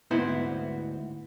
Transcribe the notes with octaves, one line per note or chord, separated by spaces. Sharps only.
D2 G#2 B3 C4 E4 C5